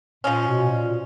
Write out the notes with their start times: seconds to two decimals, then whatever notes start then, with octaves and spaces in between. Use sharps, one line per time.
0.24 A#2 F3 G#3 C#4
0.47 B2
0.69 A#2